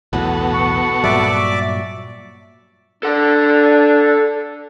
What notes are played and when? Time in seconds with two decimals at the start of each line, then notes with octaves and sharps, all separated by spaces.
0.13 B1 E2 A2 B3 F#4 A4
0.54 C#6
1.04 G2 A#2 F#3 D5 E5 D6
3.03 D4 A4 F#5